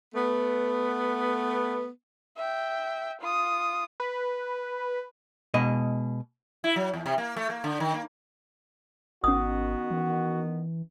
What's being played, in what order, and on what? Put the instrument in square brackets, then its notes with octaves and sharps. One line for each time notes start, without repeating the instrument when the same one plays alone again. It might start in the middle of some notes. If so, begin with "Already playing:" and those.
[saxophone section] A3 B3
[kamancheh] E5 G5
F4 D#6
[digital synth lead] B4
[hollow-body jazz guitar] B2 G#3 D#5
[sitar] E4
F#3
E2
C3
A#3
A3
A#3
D3
D#3
A#3
[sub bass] G#1 [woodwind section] D#3 B3 [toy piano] C#4 D#6 [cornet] F#4
[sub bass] E3